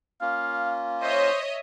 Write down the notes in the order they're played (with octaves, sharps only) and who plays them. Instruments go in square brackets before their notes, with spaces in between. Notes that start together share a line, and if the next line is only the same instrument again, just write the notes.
[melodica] A#3 C#4 F4 [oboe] F5
[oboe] C5 [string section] C#5 D#5 E5